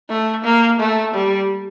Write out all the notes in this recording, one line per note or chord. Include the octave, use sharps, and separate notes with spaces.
A3
A#3
A3
G3